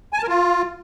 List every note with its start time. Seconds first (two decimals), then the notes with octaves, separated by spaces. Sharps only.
0.13 G#5
0.18 A5
0.23 A#4
0.28 F4